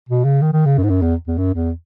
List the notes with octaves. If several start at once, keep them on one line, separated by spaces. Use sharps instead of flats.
B2
C#3
D#3
D#3
C#3
F#2
G#2
F#2
E2
E2
F#2
E2